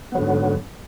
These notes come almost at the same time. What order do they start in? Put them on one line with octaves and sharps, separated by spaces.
B3 F#3 D3 G#2